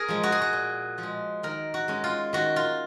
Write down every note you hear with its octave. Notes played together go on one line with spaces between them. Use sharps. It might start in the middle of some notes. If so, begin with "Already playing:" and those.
Already playing: G#4 A#4
F3 G#3
F#4
G#4
F#4
A#2
F3
G#3
D#3 A#4
F#4
G#3 C#4
F4
D#3 F#4
F4